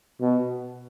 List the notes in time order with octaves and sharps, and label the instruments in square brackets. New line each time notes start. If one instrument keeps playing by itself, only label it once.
[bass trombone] B2